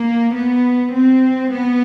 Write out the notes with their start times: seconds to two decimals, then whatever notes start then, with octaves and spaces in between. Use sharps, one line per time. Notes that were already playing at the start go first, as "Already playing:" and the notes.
Already playing: A#3
0.35 B3
0.93 C4
1.52 B3